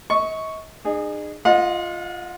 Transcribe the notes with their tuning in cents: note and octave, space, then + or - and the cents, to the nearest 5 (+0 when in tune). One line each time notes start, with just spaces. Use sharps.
D#5 +40 C#6 +0
D#4 -45 G#4 -10
F4 +0 D#5 +0 F#5 -40